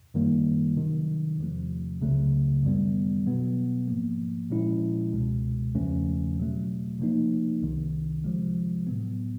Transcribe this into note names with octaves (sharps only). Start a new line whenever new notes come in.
F#2 D#3 G3 A#3
C3 D#3 F#3
E2 C3 F3 A3
C#2 C#3 F#3 A3
F#2 D#3 G3 B3
B2 F#3 B3
G#2 F3 A#3
A#2 F3 G#3 C#4 E4
C#2 B2 G#3
E2 C#3 F3 A3 C#4
B2 F#3 A3
C3 F3 A#3 D#4
C2 C3 D#3
C3 F3 G#3
A2 F#3 B3